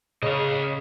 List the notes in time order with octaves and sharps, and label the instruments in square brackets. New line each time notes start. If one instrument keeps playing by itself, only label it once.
[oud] C#3 [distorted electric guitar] D#5 F5